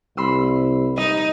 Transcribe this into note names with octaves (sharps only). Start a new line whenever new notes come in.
C2 B5 C6 E6
D#4 D#5